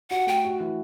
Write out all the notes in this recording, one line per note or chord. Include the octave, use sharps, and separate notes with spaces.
F#4 F#5
A3 G5
F#4
E3